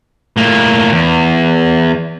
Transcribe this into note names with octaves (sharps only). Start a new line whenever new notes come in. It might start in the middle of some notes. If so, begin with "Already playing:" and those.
A2 A#3
E2